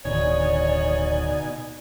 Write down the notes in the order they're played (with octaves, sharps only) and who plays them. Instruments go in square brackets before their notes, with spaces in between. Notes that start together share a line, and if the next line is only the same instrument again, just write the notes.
[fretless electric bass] D1 D3 D#3 [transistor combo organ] B2 D#4 G#5 [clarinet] C#5 [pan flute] D5